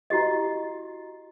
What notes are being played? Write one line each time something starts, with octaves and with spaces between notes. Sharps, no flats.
E4 F#4 G4 D#5